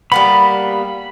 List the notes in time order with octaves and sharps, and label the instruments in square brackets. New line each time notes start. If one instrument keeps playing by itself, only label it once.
[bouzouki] G3 A#3 B3 [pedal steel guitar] B5